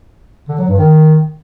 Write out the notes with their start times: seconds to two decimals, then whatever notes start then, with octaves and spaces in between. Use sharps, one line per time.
0.48 D3
0.58 F#3
0.68 G2
0.78 D#3